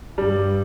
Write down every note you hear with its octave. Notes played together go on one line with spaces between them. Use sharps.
G2 G3